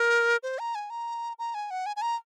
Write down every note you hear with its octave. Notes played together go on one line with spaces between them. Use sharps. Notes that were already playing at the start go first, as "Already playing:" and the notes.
Already playing: A#4
C5
A#5
G#5
A#5
A#5
G#5
F#5
G#5
G#5
A#5